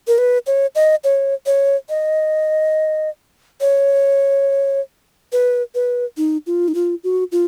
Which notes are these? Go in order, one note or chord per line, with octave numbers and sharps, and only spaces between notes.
A#4
B4
C#5
D#5
C#5
C#5
D#5
C#5
B4
B4
D#4
F4
D#4
F4
F#4
F4